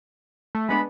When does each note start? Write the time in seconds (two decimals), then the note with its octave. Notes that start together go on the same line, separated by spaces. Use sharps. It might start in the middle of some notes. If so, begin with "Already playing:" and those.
0.55 A3
0.69 G#3 B3 D4 B5